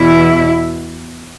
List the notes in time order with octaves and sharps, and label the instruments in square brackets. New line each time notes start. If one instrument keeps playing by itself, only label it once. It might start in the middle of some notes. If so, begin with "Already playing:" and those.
Already playing: [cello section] E2 B2 E4